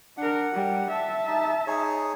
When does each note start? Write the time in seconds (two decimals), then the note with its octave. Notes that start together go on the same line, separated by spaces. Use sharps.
0.18 D4 A#4 F#5
0.53 G3
0.90 E5 A5
1.27 D#4
1.67 D#4 G#4 C#5